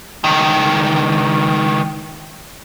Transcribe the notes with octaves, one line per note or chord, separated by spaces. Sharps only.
C#2 D#3